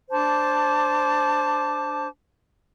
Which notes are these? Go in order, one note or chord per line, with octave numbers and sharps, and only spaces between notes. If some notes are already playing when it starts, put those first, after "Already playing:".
D4 C5 A5 D6